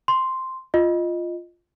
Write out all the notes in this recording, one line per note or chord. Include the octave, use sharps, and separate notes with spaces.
C6
F4 D#5